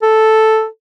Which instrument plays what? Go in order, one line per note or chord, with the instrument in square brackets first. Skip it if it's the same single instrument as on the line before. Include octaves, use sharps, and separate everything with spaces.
[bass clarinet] A4